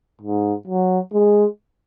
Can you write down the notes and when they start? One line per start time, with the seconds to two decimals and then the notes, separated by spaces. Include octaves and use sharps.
0.22 G#2
0.67 F#3
1.13 G#3